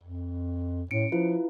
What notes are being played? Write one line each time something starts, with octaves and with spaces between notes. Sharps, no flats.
F2
A2 C#4 C#7 D7
F3 E4 F4 B4